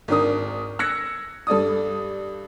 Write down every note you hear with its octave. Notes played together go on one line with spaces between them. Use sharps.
G#1 D#3 D4 A#4 D#6
E6 F#6 G#6 A#6 C#7
G2 A4 D5 D#6